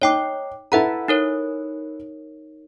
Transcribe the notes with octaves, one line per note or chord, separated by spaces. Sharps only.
D#4 C#5 G5 D6
E4 A4 B4 E5 F#5 A#5
D#4 A#4 C#5